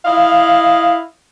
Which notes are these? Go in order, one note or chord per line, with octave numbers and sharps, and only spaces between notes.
E4 D#5 F5